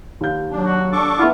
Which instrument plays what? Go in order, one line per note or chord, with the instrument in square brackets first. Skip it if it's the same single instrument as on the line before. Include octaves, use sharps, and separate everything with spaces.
[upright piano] D#2 G6
[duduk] F#3 [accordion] D4
[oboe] F#4
[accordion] D4 C#6 D6 [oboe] A4
[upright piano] B3 E5 F#5 [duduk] E4 [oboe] F4